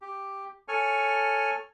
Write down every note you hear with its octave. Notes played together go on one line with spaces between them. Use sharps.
G4
A4 C#5 G#5 F6